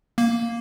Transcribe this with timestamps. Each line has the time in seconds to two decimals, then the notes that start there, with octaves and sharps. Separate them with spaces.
0.18 A#3